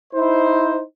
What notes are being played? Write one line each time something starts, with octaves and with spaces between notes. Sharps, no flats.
D#4 E4 C5